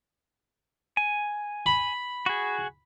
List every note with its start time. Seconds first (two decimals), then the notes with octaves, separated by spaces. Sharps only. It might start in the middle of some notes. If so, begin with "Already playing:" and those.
0.97 G#5
1.66 B5
2.26 F#4 G#4